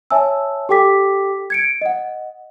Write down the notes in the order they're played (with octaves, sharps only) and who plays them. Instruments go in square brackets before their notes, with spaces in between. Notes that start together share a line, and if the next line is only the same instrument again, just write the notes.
[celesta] C#5 E5 G#5 A5 E6
G4 A4 G5 D6 B6
G#6 C#7 D7
D#5 F#5